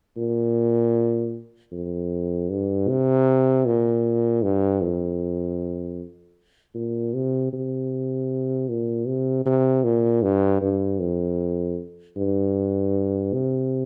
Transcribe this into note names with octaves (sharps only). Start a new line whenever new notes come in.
A#2
F2
G2
C3
A#2
G2
F2
A#2
C3
C3
A#2
C3
C3
A#2
G2
G2
F2
G2
C3